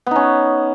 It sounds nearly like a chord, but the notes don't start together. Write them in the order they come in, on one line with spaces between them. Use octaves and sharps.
B3 D#4 C#4